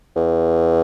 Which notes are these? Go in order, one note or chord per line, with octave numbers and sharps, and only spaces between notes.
E2